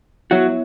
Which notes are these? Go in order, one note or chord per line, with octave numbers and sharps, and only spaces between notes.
F#3 B3 E4 F#4 C#5 E5